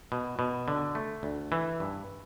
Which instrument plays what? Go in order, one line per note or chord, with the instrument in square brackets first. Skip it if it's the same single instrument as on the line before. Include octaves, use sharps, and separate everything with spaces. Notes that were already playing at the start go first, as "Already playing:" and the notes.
[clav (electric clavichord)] B2
B2
D3
A3
D2
E3
G2